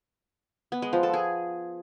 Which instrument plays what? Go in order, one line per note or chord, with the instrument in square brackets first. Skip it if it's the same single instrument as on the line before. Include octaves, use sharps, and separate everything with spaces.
[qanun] B3
G#3
F3
A4
G#4